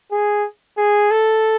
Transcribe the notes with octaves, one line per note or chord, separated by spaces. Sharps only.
G#4
G#4
A4